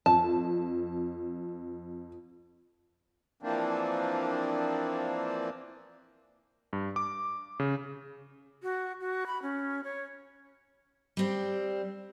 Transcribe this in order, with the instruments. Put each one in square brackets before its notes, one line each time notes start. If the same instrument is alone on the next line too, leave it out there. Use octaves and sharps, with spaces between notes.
[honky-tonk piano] F2 [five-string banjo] A5
[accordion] E3 F3 A#3 C4 D4
[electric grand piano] G2
D6
C#3
[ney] F#4
F#4
B5
C#4
C#5
[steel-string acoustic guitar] G3 C4